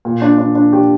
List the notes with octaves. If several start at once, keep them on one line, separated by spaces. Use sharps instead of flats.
A#2
D4
D4
D4
G4